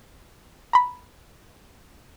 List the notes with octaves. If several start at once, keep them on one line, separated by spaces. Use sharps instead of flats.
A#5 B5